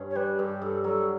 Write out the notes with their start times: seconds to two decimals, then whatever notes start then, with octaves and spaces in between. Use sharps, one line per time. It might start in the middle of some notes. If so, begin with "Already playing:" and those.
Already playing: G2 C#4
0.10 C#5
0.15 G3 B4
0.39 G2 G4
0.62 G2 A4
0.84 F#3 A4